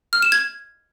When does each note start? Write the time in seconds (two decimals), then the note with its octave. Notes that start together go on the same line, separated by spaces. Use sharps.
0.13 F6
0.22 E7
0.32 G#6